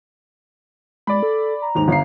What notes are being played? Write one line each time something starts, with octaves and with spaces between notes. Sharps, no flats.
G#3 D5 B5
A4
A#5
D#2 G#2 F7
G1 F5 C7